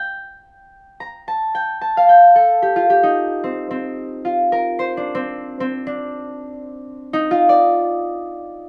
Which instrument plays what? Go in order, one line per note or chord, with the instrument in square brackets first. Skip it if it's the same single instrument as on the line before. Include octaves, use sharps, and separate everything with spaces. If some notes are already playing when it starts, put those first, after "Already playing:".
Already playing: [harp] G5
A#5
A5
G5
A5
F5
G5
A4
G4
F4
G4
D#4
C4
C4
F4
A#4
C5
D4
C4
C4
D4
D#4
F4
D5